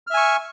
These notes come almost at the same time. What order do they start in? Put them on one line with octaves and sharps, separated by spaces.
F6 E5 G#5 C#6